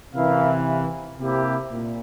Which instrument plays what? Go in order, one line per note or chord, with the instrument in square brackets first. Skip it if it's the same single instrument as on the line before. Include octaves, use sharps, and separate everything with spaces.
[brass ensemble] C3 E3 [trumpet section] C#4 E4 A#4 F5
[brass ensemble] C3 [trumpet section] A#3 E4 G4
[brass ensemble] A#2